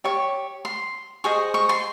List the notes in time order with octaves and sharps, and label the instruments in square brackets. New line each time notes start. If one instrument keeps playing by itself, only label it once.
[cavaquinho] G4 C#5 C#6
C6
G#4 C5 D#5 C#6
C#6
C6